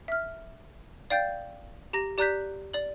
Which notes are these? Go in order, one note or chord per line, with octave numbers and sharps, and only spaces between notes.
E5 F6
D5 F5 G5 G6 A6
G4 A#5 A#6
G4 D5 A#5 F#6 G6 B6
D5 F#7